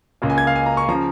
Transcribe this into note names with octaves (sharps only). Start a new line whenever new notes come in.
C#2 C#3 A#3
G#5
G#6
F5
G#5
A#5
C#6
C#3 F3 A#5